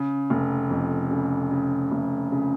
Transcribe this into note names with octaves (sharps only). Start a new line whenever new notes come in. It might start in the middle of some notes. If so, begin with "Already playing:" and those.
Already playing: C#3
F1
F2
C#3
C#3
F1
C#3